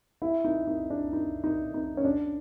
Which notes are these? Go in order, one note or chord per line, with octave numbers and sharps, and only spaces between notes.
E4
D#4
D#4
D4
D#4
D#4
D#4
C#4
D4